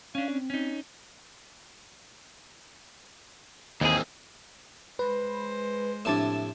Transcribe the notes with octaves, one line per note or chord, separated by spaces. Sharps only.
C#4 D4 F5
C4
C#4 D#4
D#2 E3 A#3 C4 G#4
G#3 B4 C5
A2 C3 F3 D4 A5 E7